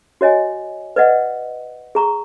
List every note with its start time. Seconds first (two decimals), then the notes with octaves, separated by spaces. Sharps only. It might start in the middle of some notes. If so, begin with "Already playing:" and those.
0.21 F#4 C#5 D#5 G#5
0.96 B4 D5 D#5 F#5
1.95 G#4 A#5 C#6